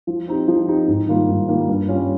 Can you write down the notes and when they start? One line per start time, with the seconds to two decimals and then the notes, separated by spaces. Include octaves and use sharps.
0.07 F3
0.28 C4 D#4 G4
0.48 F3
0.68 C4 D#4 G4
0.88 G#2
1.08 D#3 G3 A#3 F4
1.28 G#2
1.48 D#3 G3 A#3 F4
1.69 G2
1.89 G3 C#4 F4